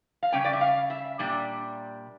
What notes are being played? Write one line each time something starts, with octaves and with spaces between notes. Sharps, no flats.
F5
C#3 G3 C#4 G5
D5
E5
F5
E5
A#2 G3 D4